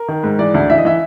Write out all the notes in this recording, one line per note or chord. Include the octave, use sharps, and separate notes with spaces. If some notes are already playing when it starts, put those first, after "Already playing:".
Already playing: A#4
D#3
G#2
E3 D5
D2
E3 E5
D#5
E3 E5